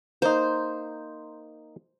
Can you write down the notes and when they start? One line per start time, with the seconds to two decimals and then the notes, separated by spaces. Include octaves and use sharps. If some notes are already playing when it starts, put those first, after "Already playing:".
0.22 A#3 D#4 C5